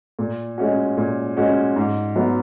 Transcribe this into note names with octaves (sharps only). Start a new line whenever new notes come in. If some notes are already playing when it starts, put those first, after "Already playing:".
A#2
G#3 C#4 F#4
A#2
G#3 C#4 F#4
G#2
F#3 B3